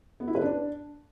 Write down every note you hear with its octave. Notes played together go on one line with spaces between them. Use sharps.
B3
E4
B4
D4